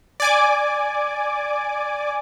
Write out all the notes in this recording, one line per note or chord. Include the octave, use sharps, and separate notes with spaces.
D5 G#5 D6